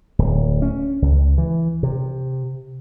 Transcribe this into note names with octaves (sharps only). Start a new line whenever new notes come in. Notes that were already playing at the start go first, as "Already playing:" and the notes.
D1
C#4
C#2
E3
C3